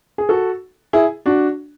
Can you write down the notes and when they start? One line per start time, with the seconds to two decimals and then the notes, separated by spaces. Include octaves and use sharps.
0.18 G#4
0.29 F#4 A4
0.93 E4 G#4
1.26 D4 F#4